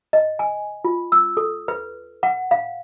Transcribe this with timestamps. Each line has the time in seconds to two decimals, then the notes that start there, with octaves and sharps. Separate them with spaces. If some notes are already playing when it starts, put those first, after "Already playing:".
0.13 D#5
0.39 G#5
0.85 F4
1.12 E6
1.37 A4
1.68 B4
2.23 F#5
2.51 F5